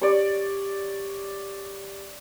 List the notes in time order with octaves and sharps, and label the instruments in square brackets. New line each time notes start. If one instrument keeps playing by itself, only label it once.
[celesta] G4 [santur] C#5 D5